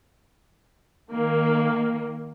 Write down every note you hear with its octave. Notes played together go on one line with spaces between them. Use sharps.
D#3 A#3